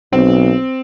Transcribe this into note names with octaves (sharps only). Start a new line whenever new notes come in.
B1 C4